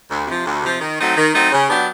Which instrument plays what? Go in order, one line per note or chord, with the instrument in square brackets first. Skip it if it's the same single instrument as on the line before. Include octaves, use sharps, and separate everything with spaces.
[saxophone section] D2
C3 F3
D2
C3 F3
D#3
F#3 A3 C4 D#4
D#3
F#3 A3 C4 D#4
C#3
F#3 B3 D4 G4